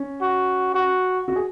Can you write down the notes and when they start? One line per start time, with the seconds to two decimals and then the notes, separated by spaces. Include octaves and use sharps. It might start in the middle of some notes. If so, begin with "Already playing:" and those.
Already playing: C#4
0.21 F#4
0.74 F#4
1.28 F#4
1.36 G#4